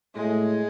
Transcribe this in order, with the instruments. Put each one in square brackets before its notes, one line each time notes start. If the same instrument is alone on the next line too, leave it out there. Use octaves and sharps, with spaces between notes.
[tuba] A2 [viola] G#3